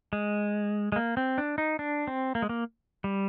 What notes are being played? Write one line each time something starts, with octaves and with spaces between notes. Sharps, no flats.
G#3
G#3
A#3
C4
D4
D#4
D4
C4
A#3
G#3
A#3
G3